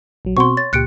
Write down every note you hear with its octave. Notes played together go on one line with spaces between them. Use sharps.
A#1 F#3
B2 C4 F#4 C6 C#6
C#5 A6
C#2 A#2 G4 F#6 C#7 D7